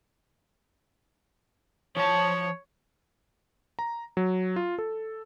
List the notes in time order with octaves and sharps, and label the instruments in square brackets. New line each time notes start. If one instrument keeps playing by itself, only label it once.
[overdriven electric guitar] F3 A5 [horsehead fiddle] C#5
[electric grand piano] A#5
F#3
F4
A4